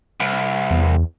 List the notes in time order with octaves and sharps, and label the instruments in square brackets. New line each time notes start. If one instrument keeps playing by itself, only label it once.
[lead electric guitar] C2
[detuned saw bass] E2